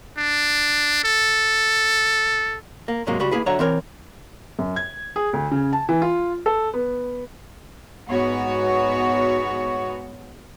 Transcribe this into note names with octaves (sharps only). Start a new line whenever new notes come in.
D4
A4
A#3
G#2 C3 F#3 G#3 A#3
C#2 G3 F#4 B5
A#3 E4 G#4 B4
D3 F#3 C#5 E5 F#5 A#5
E3 C4 A#4 C#5
F#2
G#6
G#4
D2
C#3
A5
E3
F4
A4
B3
G#2 B3 F#4 C#5